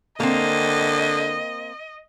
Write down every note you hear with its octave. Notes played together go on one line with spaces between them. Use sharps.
D3 A#3 C4 D#5